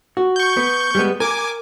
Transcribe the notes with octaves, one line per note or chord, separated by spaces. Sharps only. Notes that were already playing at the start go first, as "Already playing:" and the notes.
F#4
C#6 G6
B3
G3 G#3 B3
A#4 G#5 D6